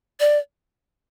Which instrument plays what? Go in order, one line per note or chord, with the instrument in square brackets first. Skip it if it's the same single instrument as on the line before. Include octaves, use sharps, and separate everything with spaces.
[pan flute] D5